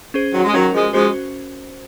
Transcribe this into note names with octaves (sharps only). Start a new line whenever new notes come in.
C#4 G#4 C5
D#3 F#3
G#3
D#3 F#3 C#4 F#4 A#4
F3 G#3
F3 G#3 C#4 F#4 C5